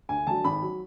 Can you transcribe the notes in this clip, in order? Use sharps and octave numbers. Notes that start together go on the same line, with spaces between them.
D2 G#5
D3 F#3 A5
G#1 B5
F#3